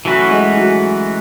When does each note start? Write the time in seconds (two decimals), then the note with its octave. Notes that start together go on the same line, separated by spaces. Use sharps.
0.05 E3 F#3 A3 C#4 F#4 B4
0.31 G#3
0.57 F#3